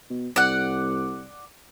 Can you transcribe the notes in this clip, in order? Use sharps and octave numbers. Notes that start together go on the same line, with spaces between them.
B2
C2 D5 F#5